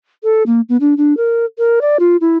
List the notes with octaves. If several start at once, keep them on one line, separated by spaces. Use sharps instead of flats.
A4
A#3
B3
D4
D4
A#4
A#4
D5
F4
E4